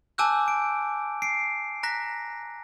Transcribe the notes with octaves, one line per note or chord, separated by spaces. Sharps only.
G#5 A5 D6 E6 F#6 G6
D7
C7 D7
A#5 F#6 A#6 B6